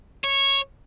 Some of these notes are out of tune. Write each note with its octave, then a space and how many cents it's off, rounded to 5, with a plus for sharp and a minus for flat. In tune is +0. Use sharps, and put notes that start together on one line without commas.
C#5 -10